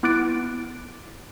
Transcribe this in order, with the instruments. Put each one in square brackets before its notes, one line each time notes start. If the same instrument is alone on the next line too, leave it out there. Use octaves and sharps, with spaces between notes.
[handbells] B3 E4 D6 F#6 A6 D7